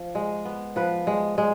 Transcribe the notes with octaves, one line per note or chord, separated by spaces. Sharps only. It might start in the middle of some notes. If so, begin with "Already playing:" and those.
Already playing: F3
G#3
B3
F3 B4
G#3
G#3